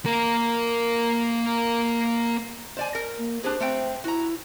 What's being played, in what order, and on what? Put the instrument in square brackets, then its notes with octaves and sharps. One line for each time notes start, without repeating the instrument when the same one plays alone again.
[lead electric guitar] A#3 A#4
[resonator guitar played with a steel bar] C5 D5 G#5
A#4
[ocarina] A#3
[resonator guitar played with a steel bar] D4 G4 G#4 [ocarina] C5
[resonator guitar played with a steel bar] A3 C4 G5
[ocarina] E4 [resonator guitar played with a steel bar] F#4 A#5